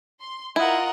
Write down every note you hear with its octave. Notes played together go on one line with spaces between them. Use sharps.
C6
E4 F4 A#4 D#5 F#5